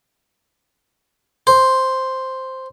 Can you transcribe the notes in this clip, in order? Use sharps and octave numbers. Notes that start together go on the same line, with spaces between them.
C5